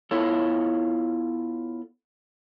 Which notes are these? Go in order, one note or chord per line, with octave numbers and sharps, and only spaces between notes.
B3 E4 F4 A4 C#5